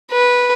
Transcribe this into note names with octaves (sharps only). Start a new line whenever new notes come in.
B4